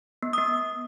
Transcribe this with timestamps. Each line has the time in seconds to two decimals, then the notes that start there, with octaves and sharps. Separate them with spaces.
0.23 B3
0.33 B3 D#6